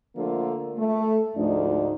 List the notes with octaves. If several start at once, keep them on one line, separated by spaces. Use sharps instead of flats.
D3 F3 A3 A#3 F4 A4
A3
D2 G#2 F3 D4 D#4